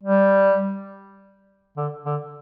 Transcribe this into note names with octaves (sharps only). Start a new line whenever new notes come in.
G3
D3
D3